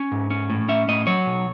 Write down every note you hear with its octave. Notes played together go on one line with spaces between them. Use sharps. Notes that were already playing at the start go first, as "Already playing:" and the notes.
Already playing: C#4
G#2
C#4
A2
C#4 E5
A2 D#5
F#3 C#5
B1